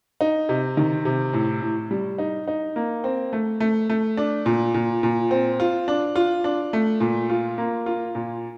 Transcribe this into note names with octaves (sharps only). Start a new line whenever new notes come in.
D#4
C3
D#3
C3
A2
A2
G3
D#4
D#4
A#3
C4
A3
A3
A3
D4
A#2
A#2
A#2
C4
F4
D4
F4
D4
A3
A#2
F4
A#3
F4
A#2